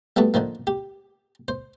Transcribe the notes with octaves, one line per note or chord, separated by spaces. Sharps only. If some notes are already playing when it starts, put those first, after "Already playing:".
G3 A3 B3 F#4 A4
D3 D#3 F3 A#3
G4
C5